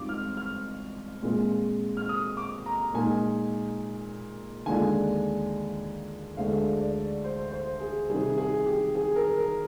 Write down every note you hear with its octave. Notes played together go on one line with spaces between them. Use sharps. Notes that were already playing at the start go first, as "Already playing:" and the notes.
Already playing: G#2 G3 C4 F4 D6
F6
F6
A#2 G#3 C4 F4
F6
D#6
D6
A#5
A#2 G#3 D#4 G#5
D#2 D3 G#3 D4 F4 G#5
D2 D3 G#3 D4 F5
D5
C5
C5
G#4
C3 D#3 G3 G#4
G#4
G4
G#4
A#4
A#4